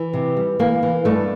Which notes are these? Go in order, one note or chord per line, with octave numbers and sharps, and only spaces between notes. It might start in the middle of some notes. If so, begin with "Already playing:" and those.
Already playing: E3
C3
G3
E3 A#3
E3
G2 A3